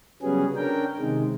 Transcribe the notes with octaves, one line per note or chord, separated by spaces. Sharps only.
C#3 F#3 G3 B3 C#4 G#4
C#4 D4 A#4 G5
C3 D#3 G#3